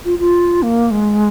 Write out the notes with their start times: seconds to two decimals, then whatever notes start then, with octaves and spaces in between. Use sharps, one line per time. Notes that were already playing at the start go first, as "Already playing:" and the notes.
0.05 F4
0.19 F4
0.62 A#3
0.91 G#3